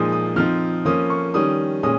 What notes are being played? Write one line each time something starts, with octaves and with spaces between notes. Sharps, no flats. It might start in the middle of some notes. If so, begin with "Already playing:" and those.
Already playing: A#2 F3 G#3 D#4 D#6
D#6
F3 C4 D#4 F6
F3 A#3 C#4 D#6
C#6
D#3 G3 C#4 D#6
A#2 G#3 C#4 D#6